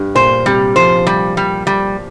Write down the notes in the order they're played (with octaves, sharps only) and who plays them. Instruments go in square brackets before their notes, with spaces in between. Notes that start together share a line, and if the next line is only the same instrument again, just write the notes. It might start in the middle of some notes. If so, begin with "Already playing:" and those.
Already playing: [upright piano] G2
[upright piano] A#2 [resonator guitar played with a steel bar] C5
[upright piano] C3 [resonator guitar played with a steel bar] G3
[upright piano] F3 [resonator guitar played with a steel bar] C5
[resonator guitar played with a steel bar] G3
G3
G3